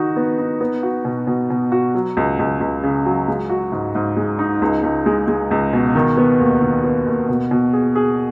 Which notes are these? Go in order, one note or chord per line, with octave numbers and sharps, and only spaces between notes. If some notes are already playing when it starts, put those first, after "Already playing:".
Already playing: D#3 D#4 F#4
B3
D#4
B3
F#4
B2
B2
B2
F#4
F#3
C#2
C#2
C#2
C#3
F#3
G#3
F#4
G#2
G#2
G#3
D#4
C#2
C#2
G#3
G#3
C#2
B2
D#3
B3
D#2
D#3
B3
D#2
B2
B2
G#4
G#4